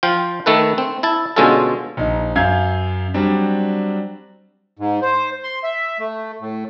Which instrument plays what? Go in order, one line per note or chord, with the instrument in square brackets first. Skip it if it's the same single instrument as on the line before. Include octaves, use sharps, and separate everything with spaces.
[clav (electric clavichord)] F3 F4 G5
D#3 A3 A4 B4
C4
E4 A5
B2 D3 G#3 C#4 F4 A4
[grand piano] A#1 D#4
F#2 F5 G6 G#6
F#3 G3 C4 D4
[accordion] G#2
C5
C6
E5
A3
A2